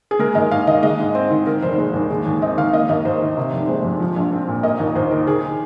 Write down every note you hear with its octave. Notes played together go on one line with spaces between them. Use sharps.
G#4
G#3 A#4
D#2 D#5
D#2 F5
D#3 D#5
G#3 D#5
G#2
C4
D#3
D#3 A#4
F1 C5
G#3
D#2
G#3
D#2
C4 D#5
D#3 F5
A#3 D#5
D#2 D#5
D#2 C5
D#3
C3
F1
G#3 C5
F2
F3
A#1
C4
A#2
A#3 D#5
D#2
D#2 C5
D#3 A#4
D#3 G#4